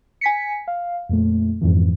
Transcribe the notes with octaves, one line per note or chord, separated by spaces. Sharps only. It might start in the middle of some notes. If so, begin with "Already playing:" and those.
G#5 B6 C#7
F5
F2 A#2 A3
F2 G#2 E3 F3